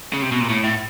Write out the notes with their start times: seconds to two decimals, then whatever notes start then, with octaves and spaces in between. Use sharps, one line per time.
0.13 C#3
0.22 C3
0.32 B2
0.41 A#2
0.50 A2
0.64 A2